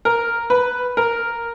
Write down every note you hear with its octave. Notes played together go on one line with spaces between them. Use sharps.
A#4
B4
A#4